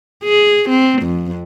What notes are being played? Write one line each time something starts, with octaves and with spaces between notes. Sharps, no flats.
G#4
C4
F2